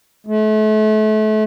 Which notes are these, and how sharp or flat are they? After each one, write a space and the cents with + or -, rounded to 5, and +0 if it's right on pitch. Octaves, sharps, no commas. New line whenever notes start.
A3 -35